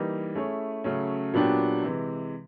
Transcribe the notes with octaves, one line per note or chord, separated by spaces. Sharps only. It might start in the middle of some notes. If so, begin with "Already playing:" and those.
Already playing: E3 G3 A#3 D#4
A3 C#4 E4 G#4 C#5
C#3 F#3 A3 C#4
A#2 F#3 B3 D4 G4
C3 E3 G#3